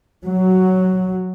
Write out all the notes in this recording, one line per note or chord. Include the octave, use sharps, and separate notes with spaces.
F#3